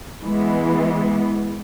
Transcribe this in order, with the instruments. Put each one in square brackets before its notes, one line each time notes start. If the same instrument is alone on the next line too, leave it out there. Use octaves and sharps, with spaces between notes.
[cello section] E3 G#3 B3